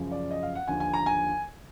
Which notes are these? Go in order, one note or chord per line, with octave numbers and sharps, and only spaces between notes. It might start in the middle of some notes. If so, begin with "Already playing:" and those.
Already playing: F#2 C#3 F3
D5
D#5
F5
F#5
D#2 D3 F3 G#5
G#5
A#5
G#5